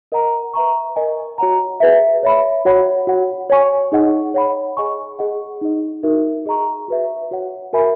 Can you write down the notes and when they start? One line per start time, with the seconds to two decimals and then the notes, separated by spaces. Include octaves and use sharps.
0.12 A#4 D#5 F#5 A#5
0.54 B4 E5 A#5 C#6
0.96 A#4 D#5 G#5
1.38 F#4 C#5 F#5 A#5
1.80 G#4 B4 E5
2.23 C#5 E5 B5
2.65 F#4 C#5 F#5 B5
3.07 F#4 C#5 F#5
3.50 C#5 G#5 C#6
3.92 D#4 G#4 D#5 F#5
4.34 C#5 F#5 B5
4.77 G#4 D#5 G#5 C#6
5.19 G#4 D#5 F#5
5.61 D#4 G#4 D#5
6.03 D#4 F#4 A#4 E5
6.46 G#4 D#5 A#5 C#6
6.88 F#4 B4 E5
7.31 F#4 C#5 F#5
7.73 F#4 A#4 E5 G#5 B5